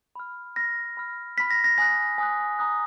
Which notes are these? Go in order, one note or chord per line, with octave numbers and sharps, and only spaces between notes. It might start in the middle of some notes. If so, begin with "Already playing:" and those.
B5 F6
B5 F6 A#6
B5 F6
B5 F6 B6
A#6
A#6
G#5 D#6 F#6 A#6
G#5 D#6 F#6
A#5 D#6 F#6